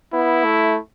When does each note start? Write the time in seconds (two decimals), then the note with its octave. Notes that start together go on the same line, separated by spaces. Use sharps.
0.13 B3 E4
0.44 A3